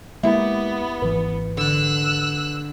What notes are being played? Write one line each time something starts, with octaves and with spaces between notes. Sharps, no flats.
G#3 A#3 B3 E4 G4 E5
G#1 E3 B4
D3 E6 F#6